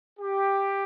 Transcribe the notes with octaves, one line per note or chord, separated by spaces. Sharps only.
G4